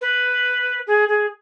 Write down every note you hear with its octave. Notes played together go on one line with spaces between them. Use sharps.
B4
G#4
G#4